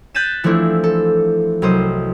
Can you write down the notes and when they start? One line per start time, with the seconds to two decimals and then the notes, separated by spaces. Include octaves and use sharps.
0.14 F#6 G6 A6 B6 D#7 E7
0.44 E3 F3 A3 C4 D4 E4
0.84 A4
1.62 C2 F#3 C5 D#5